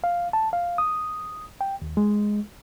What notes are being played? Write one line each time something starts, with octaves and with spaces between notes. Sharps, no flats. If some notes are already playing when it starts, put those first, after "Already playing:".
F5
A5
F5
D#6
G5
D#2
G#3